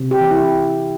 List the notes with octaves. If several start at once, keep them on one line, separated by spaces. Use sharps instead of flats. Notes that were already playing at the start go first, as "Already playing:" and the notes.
Already playing: C3
G4
E3
E4